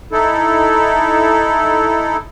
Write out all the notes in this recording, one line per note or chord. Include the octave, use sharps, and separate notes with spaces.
D#4 E4 A4